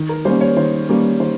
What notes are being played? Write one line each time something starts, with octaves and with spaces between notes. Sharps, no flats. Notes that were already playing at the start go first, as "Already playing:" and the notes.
Already playing: D#3
A#4
G3 A#3 C#4 C5
C#5
D#3 C5
G3 A#3 C#4
D#3 C5